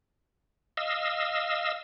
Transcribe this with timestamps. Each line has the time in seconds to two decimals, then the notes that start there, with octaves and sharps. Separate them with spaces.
0.77 D#5 F5 E6